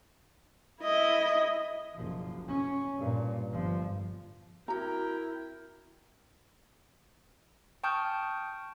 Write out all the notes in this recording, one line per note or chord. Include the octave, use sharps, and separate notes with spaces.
E4 D#5
F#1 F3
C#4
G2 A#2
G1 F3
C4 E4 F#4 A#4 G5 A#5
G5 A5 C#6 D#6 F6 G6